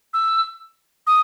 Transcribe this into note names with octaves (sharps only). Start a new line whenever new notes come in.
E6
D#6